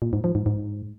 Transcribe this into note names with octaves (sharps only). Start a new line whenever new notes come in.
A#2
G#2
F3
G#2
G#2